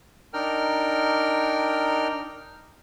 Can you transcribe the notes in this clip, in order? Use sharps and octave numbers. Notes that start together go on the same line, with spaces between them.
D4 D#4 A#4 G5 F6